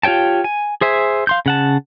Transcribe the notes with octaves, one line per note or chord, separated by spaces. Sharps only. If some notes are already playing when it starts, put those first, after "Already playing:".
F4 G4 C#5 G5 A5
G#5
G#4 C5 E5 G#5
F5 C6 G6
C#3 F#5 A5